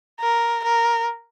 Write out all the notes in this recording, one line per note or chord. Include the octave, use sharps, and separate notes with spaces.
A#4
A#4